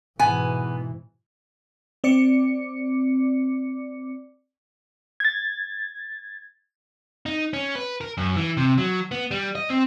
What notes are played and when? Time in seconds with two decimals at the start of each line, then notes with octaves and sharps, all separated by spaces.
0.19 G#2 B2 E3 B3 G#5
2.04 C4 D5 D6 C#7
5.20 G#6 A6
7.26 D#4
7.53 C#4
7.75 B4
8.01 A#4
8.18 F#2
8.36 E3
8.57 C3
8.78 F#3
9.11 B3
9.31 G3
9.55 D#5
9.70 C4